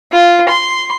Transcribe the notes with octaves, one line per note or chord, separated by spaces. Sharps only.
F4
C6